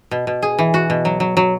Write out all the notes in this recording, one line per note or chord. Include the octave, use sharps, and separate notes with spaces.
B2
B2
G#4
E3
F#4
B2
F#3
F#3
F#3